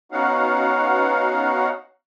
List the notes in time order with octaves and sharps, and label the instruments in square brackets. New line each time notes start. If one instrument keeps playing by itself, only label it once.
[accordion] B3 C#4 D#4 F#4 F5 F#5